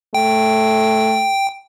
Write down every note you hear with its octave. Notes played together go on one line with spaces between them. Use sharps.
A3 G5